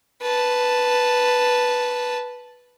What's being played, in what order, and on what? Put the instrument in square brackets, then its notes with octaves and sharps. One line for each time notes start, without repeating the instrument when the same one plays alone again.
[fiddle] B4 A5